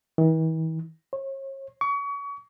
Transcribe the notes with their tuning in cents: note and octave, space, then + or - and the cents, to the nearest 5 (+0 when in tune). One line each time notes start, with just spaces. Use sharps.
E3 -45
C#5 -40
C#6 +35